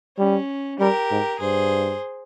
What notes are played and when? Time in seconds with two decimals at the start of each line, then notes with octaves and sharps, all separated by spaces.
0.18 G3 C#4
0.80 G3 G4 A#4
1.11 G#2
1.40 G2 G#4 C5